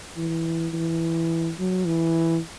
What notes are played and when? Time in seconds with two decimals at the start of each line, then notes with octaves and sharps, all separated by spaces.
0.17 E3
0.73 E3
1.59 F#3
1.86 E3